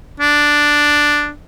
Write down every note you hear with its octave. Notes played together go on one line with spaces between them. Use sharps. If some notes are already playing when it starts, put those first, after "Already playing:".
D4